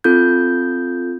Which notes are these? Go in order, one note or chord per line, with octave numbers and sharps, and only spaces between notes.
C4 F4 A4 G6